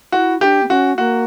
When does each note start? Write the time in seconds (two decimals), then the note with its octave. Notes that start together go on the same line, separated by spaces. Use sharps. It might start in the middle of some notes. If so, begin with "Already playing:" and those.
0.12 E4 F#4
0.41 D4 G4
0.63 B3
0.69 C#4 F#4
0.98 A#3 F#4